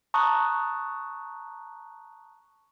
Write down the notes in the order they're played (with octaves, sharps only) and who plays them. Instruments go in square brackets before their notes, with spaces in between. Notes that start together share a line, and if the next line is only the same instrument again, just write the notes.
[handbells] A5 A#5 C#6 D#6 F#6